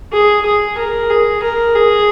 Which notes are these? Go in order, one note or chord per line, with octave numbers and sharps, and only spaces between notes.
G#4
G#4
A#4
G#4
A#4
G#4